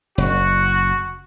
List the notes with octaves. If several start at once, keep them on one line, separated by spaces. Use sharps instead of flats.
F#1 F#4